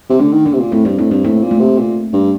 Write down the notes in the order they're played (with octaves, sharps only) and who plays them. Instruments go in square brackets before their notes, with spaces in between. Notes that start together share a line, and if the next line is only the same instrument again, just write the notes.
[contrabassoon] C3
[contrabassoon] D3 [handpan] A3
[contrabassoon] D#3
[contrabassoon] D3 [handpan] A#3
[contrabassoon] C3
A#2
[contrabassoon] A2 [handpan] C4
[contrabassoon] G2 [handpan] D4
[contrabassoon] A2 [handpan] C4
[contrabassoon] G2 [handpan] C4
[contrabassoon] A2 [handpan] A#3
[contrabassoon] A#2
[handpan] A3
[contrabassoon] C3
A#2
G2